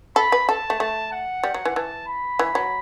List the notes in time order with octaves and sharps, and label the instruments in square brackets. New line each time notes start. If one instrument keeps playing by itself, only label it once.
[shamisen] A4 [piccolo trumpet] B5
[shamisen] B4
[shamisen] A4 [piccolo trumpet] A5
[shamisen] A3
[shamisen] A3 [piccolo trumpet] A5
[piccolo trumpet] F#5
[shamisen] G3
F#3
E3
[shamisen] E3 [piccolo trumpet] A5
[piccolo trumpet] B5
[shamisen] E3
F#3